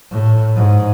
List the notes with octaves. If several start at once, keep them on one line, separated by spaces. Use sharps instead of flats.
A2
G#2